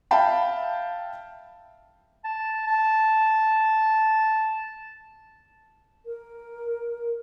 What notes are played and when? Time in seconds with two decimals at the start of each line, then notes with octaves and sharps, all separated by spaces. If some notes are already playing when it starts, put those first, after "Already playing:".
0.11 E5 F5 G5 A5 B5
2.24 A5
2.67 A5
6.06 A#4